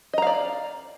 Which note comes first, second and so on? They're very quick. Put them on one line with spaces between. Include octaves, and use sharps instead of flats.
D#5 A#5 F5 D5